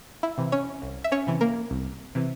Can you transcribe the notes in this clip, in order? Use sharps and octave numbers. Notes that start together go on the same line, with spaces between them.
E4
C3 E3
C#4 C#5
C2
E5
C#4 C#5
C3 E3
A#3 A#4
C2
C3 E3